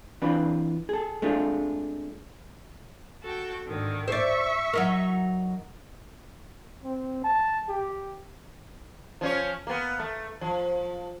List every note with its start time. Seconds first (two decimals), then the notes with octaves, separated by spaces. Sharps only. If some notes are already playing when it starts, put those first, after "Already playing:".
0.22 E3 C4 D4 F4 B4
0.89 G#4 A4
1.22 G#3 A3 C4 D4 F4
3.22 F#4 A4 G5
3.65 G#2 D3 D#3
4.08 C5 D5 E5 C#6
4.73 F#3 D#4 A#4
6.83 C4
7.24 A5
7.69 G4
9.21 F3 C#4 C#5
9.67 A#3 B3
9.99 A3
10.41 F3